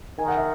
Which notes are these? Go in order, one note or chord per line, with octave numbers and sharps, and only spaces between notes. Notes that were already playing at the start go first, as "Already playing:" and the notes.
D#3 G#5
F#5
E5